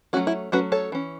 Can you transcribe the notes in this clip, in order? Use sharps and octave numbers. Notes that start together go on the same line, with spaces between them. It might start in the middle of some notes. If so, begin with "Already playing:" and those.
F#3 A3 C#4 F#4
E4
F#3 A3 C#4 F#4 B4
A4 C#5
E3 C#4